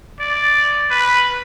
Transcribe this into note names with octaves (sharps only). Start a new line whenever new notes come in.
D5
B4